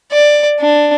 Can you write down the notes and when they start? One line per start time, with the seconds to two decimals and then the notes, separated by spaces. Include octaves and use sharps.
0.12 D5
0.60 D4